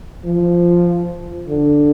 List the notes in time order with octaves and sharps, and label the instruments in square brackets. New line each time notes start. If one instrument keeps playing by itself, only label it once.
[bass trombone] F3
D3